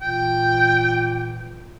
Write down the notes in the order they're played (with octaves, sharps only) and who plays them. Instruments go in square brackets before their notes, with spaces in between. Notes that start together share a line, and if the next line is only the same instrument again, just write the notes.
[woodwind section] A#2 E3 [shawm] G5